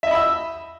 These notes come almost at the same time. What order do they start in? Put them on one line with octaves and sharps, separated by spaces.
E5 D#5 B5 E6